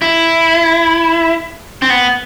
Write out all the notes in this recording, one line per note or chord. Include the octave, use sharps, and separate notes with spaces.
E4
C4
B3